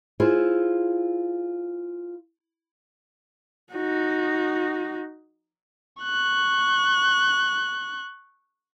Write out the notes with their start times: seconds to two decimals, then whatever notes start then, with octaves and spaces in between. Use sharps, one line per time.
0.20 E4 F4 G#4 C5
3.73 D#4 F#4
6.03 C#6 F#6